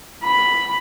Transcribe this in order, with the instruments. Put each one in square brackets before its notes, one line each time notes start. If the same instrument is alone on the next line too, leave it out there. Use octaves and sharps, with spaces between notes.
[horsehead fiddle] B5